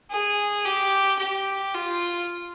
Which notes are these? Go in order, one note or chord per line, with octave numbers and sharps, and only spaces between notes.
G#4
G4
G4
F4